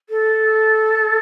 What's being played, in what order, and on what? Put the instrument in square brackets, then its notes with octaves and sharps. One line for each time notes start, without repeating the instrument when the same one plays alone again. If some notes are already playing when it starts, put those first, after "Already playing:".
[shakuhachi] A4